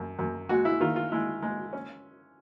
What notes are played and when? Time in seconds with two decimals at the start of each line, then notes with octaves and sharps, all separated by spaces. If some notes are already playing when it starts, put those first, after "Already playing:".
Already playing: F#2
0.19 F#2
0.49 G#3 F#4
0.65 E4
0.81 D#3 F4
0.96 F4
1.12 G#3 E4
1.42 G#3
1.73 C#4